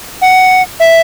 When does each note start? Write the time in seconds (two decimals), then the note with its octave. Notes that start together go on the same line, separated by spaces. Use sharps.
0.22 F#5
0.80 E5